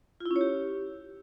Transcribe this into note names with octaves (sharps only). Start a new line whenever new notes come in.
F4
E4
C#4
C#5
G4